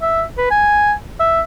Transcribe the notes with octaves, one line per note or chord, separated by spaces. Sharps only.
E5
B4
G#5
E5